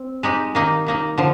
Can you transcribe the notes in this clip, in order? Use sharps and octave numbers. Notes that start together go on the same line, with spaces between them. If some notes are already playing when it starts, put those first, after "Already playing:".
Already playing: C4
G#3 D#4 G4
D#3 A#3 D#4
D#3 A#3 D#4
D3 F3